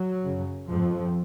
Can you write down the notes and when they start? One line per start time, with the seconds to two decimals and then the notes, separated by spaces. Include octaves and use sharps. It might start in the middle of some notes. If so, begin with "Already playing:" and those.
Already playing: F#3
0.24 F#2 C#3
0.69 F2 G#2 F3